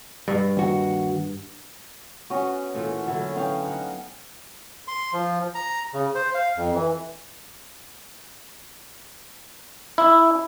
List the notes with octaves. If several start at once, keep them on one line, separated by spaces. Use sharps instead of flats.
G2
D#2 F#4
B3 C#4 F#4
A#2 E3 A3
D3 F#3 E4
B3 C#4 F5 G5
D#4 F#5
C6
F3
A#5
C#3
C5
F5
F2
E3
E4